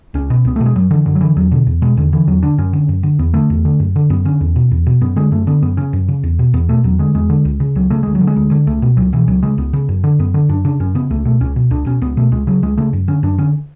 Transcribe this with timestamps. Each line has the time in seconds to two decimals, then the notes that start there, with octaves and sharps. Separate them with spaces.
0.14 C#2 C#4
0.30 B2
0.45 C#2 B3
0.56 A3
0.61 B2
0.66 G#3
0.76 F#2 F#3
0.91 D3 E3
1.06 F#2 D3
1.15 F#3
1.21 D3 E3
1.37 E2 F#3
1.51 B2 D3
1.67 E2
1.82 B2 G#3
1.97 E2 D3
2.13 D3 E3
2.27 E2 F#3
2.43 D3 D4
2.58 F#2 C#4
2.73 D3
2.89 F#2
3.03 D3
3.19 E2 B3
3.34 D3 A3
3.50 E2
3.65 D3
3.80 F#2
3.96 D3
4.10 F#2 B3
4.25 D3 C#4
4.41 E2
4.56 B2
4.71 E2
4.87 B2
5.01 F#2 B3
5.16 D3 G#3
5.32 F#2 A3
5.47 D3 B3
5.63 F#2 B3
5.77 C#3 C#4
5.93 F#2
6.08 C#3
6.23 E2
6.39 B2
6.54 E2 B3
6.69 B2 A3
6.84 E2 F#3
6.99 D3 G#3
7.15 E2 G#3
7.30 D3
7.45 C#2
7.60 C#3
7.75 C#2 F#3
7.90 C#3 A3
8.03 D2 G#3
8.15 F#3
8.21 D3
8.27 G#3
8.36 D2
8.51 D3
8.67 C#2 A3
8.82 B2
8.97 C#2 F#3
9.13 B2 E3
9.28 C#2 F#3
9.43 C#3 G#3
9.58 C#2 B3
9.73 C#3
9.89 F#2
10.04 D3
10.19 F#2 B3
10.34 D3
10.49 F#2 D4
10.65 C#3 D4
10.80 F#2 C#4
10.95 C#3 B3
11.10 C#2 A3
11.25 B2 A3
11.41 C#2 C#4
11.56 B2
11.71 C#2 D4
11.86 B2 C#4
12.02 C#2 B3
12.17 B2 A3
12.32 C#2 G#3
12.47 C#3 F#3
12.63 C#2 G#3
12.77 C#3 A3
12.93 F#2
13.08 D3 C#4
13.23 F#2 D4
13.38 D3 C#4